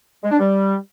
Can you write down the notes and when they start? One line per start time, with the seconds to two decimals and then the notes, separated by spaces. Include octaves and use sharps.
0.23 G#3
0.31 D4
0.39 G3